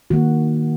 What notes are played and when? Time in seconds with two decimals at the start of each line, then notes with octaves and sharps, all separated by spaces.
0.10 D#3 A#3 F#4